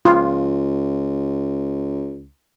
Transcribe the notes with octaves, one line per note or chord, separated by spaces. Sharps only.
C#2 F4